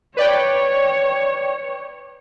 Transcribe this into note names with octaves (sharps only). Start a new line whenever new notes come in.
B4 C#5 D5 G5